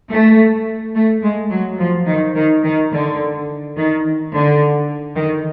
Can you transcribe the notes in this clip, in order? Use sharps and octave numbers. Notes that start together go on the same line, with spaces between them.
A3
A3
G#3
F#3
F3
D#3
D#3
D#3
D3
D#3
D3
D#3